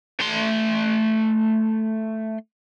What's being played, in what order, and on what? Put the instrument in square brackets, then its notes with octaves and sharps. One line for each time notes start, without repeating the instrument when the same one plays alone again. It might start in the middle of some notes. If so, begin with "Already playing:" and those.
[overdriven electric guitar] A3 C6